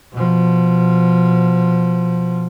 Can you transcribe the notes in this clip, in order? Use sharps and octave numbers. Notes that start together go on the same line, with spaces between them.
B2 F3